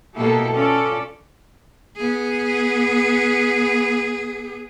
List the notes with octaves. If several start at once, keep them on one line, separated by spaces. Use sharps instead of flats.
B2 A#3 E4 G4 A4
C#4 F4 A4 D5
B3 G#4